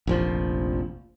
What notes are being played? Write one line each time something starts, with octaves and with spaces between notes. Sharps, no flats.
F1 A#1 F3